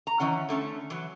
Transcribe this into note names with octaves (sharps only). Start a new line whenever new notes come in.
A#5
D#3 E3 C#4 F#5
D3 A3 C#4
E3 F#3